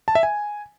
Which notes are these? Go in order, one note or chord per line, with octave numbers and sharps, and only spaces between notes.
A5
E5
G#5